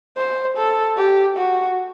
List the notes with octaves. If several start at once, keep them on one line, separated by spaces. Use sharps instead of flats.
C5
A4
G4
F#4